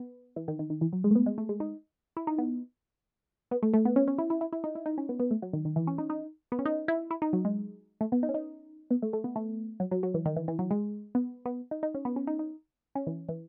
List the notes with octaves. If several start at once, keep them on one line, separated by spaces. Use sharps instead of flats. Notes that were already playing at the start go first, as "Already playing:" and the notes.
Already playing: B3
E3
D#3
D#3
D#3
E3
F#3
G#3
A3
B3
G#3
A3
G#3
D#4
E4
D#4
B3
B3
A3
A3
B3
C#4
C#4
E4
E4
E4
E4
D#4
E4
D#4
C#4
B3
B3
A3
F#3
D#3
D#3
E3
C#4
D#4
D#4
B3
C#4
D#4
E4
E4
D#4
F#3
G#3
A3
B3
D#4
C#4
D#4
B3
A3
A3
B3
A3
F#3
F#3
F#3
E3
D#3
E3
E3
F#3
G#3
B3
B3
D#4
D#4
C#4
B3
C#4
D#4
D#4
C#4
E3
E3